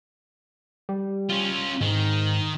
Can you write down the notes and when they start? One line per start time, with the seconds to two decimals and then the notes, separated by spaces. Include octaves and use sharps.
0.89 G3
1.30 C#4 F4
1.81 G#2 D#3